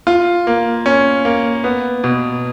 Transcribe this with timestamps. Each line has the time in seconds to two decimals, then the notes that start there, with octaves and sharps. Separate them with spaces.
0.07 F4
0.47 A#3
0.86 C#4
1.25 A#3
1.64 B3
2.04 B2